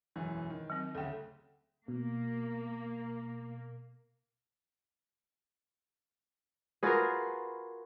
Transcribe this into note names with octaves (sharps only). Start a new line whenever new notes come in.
E1 F#2 E3
D#3
F#3 C4
D2 C#3 A4 G5
B2 A#3
F4 F#4 G#4 A#4 B4